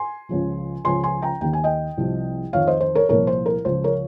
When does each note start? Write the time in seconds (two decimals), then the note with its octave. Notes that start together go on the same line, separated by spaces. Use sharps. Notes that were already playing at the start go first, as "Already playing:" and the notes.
Already playing: G#5 C6
0.29 C#2 C#3 F3
0.85 C#2 C#3 F3 G#5 C6
1.03 G#5 C6
1.22 G5 A#5
1.41 D#2 D#3 G5
1.53 G#5
1.64 D#5 G5
1.97 C2 C3 F3
2.53 F2 D#3 C#5 F5
2.67 C5 D#5
2.80 C5
2.95 A#4 C#5
3.09 C2 A#2 F3 A#4 C#5
3.27 C5
3.46 A#4
3.65 C#2 C#3 F3 C5
3.84 A#4 C#5